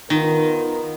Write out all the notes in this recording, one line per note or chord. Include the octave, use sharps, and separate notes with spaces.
D#3 B3 F4 A#4